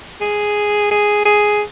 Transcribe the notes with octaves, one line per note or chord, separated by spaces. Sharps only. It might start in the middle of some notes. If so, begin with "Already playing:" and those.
G#4
G#4
G#4